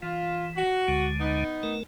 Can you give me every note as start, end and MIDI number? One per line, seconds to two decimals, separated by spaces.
0.02 0.64 52
0.02 0.48 65
0.56 1.07 66
0.88 1.44 38
0.88 1.44 50
0.88 1.44 56
1.20 1.76 59
1.20 1.76 63
1.63 1.83 57
1.63 1.83 70